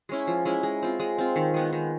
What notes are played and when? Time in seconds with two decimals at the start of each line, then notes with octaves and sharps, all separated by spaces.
0.09 G#3 C#4 E4
0.27 F3
0.45 G#3 C#4 E4
0.63 G#3
0.82 C4 F4
1.00 G#3
1.18 C4 F4
1.36 D#3
1.54 G#3 B3
1.73 D#3